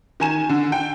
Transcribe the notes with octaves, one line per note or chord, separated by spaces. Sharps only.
D#3 G#5 E7
D3
G5